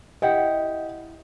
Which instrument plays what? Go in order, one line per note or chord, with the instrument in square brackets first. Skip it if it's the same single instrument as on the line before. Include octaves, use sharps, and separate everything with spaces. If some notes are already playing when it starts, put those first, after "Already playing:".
[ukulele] E4 G4 F#5 [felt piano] D#5